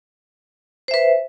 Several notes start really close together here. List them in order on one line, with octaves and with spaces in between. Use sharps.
C5 E5 B4